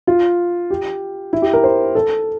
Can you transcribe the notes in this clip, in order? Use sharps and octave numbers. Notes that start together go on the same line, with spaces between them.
F4
G4
E4
G4
A#4
C5
A4